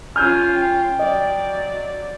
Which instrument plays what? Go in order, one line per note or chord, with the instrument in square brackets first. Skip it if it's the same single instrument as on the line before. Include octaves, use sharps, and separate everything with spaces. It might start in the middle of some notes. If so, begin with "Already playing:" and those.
[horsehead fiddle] C#4 F4 [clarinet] G#5 [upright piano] F6 G6
[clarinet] G5
[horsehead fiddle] F#3 D5 [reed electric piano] D#5